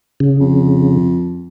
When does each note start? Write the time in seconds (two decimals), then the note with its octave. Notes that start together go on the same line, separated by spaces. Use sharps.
0.20 C#3
0.40 F2